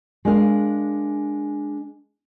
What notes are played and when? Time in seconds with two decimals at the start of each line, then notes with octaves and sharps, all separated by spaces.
0.25 G#3 D4 A#4 F5